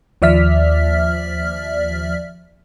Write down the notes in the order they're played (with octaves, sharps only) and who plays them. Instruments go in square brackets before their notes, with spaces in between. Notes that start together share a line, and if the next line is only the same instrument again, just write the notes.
[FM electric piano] D#2 F3 D5 E5 F6 B6